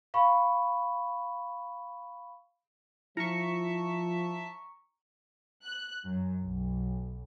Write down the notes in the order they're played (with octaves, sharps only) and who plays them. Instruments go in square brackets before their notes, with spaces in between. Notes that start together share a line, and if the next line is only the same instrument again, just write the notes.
[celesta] F5 B5 C#6
[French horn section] F3 [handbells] E4 [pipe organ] E5 A5 [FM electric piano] A#5 C#6
[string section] F#6
F#2
B1